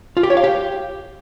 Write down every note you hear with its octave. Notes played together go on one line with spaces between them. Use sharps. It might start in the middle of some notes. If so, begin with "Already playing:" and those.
F4
G4
C#5
F5
G4